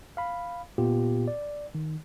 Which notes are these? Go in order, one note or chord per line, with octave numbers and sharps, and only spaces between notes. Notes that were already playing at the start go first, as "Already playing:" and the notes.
F5 B5
A#2 B3 F4 G4
D5
D#3